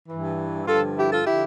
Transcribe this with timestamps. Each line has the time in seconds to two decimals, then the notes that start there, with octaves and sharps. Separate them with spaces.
0.09 G2 E3
0.67 G2 D3 F3 F4 A4
0.96 E4 G4
1.10 F4 A4
1.24 D3 F3 E4 G4